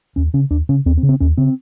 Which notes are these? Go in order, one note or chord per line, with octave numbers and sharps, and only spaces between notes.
D#2 C#4
C#3 C#4
D#2 D4
C#3 C#4
D#2 C4
C4
C#3
C4
D#2 C#4
C#3 C4